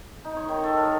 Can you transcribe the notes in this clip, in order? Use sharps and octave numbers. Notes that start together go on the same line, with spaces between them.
D#4
C#5
D#3
A4
A#4